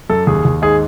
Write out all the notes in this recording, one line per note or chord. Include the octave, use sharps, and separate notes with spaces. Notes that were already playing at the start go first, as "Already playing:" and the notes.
F#2 A4
D#2 G#4
D#2
G#2 G#4